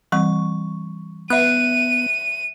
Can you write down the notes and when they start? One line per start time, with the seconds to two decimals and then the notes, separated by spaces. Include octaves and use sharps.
0.12 E3 G3 C4 C#6
1.30 B3 E5 F#6 D#7